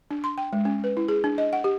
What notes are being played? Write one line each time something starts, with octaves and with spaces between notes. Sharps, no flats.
D4
C6
G5
G#3
C#4
B4
E4
G#4
D4
D#5
F#5
G4